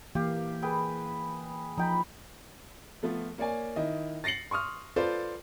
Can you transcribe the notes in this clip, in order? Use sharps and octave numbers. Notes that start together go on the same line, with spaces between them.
E3 A#3 G4 F5
G#4 B4 G5
F3 D#4 G5 B5
F3 A3 B3 F4
A#3 C#5 D5 G#5
D#3 E4 D#5
A6 A#6 C7 C#7 F#7
C6 C#6 D#6 F6
F4 A4 B4 C5 D5